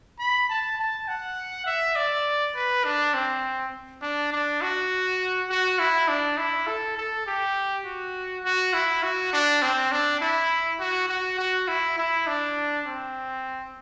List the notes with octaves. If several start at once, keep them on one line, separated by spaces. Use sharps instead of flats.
B5
A5
A5
F#5
E5
D5
B4
D4
C4
D4
D4
F#4
F#4
E4
D4
E4
A4
A4
G4
F#4
F#4
E4
F#4
D4
C4
D4
E4
F#4
F#4
F#4
E4
E4
D4
C4